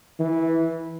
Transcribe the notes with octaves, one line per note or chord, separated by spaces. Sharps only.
E3